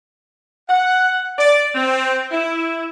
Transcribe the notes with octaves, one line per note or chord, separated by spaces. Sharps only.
F#5
D5
C4
E4